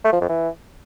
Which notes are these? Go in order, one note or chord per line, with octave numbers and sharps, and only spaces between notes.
A3
F3
F2
E3